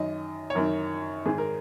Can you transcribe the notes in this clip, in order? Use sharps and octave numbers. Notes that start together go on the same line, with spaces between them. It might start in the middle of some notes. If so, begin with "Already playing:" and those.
Already playing: F#2 D#3 D#5
C#5
F#2 D#3 A#4
G#2 D#3 G#4
A#4